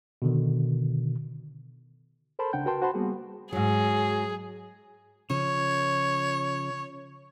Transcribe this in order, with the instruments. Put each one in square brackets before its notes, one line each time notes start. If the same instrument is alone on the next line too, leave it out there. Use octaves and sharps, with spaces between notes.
[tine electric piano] B2 D3 D#3
[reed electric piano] A4 A#4 C5 A5 B5 C6
C#2 C#3 D4 F#5 G5 G6
F#4 A#4 B4 G5 A5 C6
F#4 C5 F#5 A5 B5 C6
G3 A#3 B3 F#4 G#4
[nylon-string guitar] G#2 F#3 [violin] G#4
[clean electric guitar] C#3 F3 [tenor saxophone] C#5